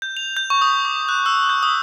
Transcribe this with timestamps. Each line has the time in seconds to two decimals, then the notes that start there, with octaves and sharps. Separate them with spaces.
0.02 G6
0.17 F7
0.37 G6
0.50 C#6
0.61 D#6
0.85 D6
1.09 F#6
1.26 E6
1.49 G6
1.63 D#6